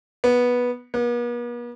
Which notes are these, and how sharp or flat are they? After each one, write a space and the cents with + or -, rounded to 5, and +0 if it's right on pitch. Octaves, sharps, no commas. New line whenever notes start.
B3 -10
B3 -45